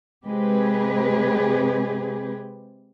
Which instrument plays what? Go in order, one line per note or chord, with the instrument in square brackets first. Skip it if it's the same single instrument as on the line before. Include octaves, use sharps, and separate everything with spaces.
[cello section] C3 G#3 C4 G4 G#4 B4